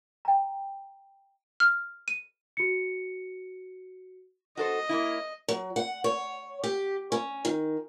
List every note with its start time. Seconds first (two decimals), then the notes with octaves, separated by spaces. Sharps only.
0.25 G5 A#5
1.60 F6
2.08 D#7
2.57 F#4 C#7
4.57 F#4 A4 C5 D#5
4.89 A#3 C#4 E4
5.48 F#3
5.76 F#5
6.04 C#5
6.63 G4
7.12 C#4
7.45 D#3